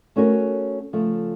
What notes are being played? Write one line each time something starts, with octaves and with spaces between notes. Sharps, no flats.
A3 C#4 F#4 A#4 C#5
C#3 F3 A3